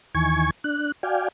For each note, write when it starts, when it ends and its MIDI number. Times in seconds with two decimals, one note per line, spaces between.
0.15 0.50 39
0.15 0.50 51
0.15 0.50 52
0.15 0.50 80
0.15 0.50 85
0.15 0.50 92
0.64 0.92 62
0.64 0.92 90
1.03 1.28 66
1.03 1.28 74
1.03 1.28 77
1.03 1.28 79
1.03 1.28 80